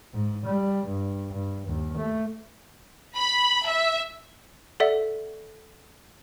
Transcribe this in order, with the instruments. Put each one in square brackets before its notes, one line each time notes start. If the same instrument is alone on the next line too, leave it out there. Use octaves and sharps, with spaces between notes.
[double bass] G#2
G3
G2
G2
D#2
A3
[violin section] B5
E5
[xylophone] A4 D5 E5 F#5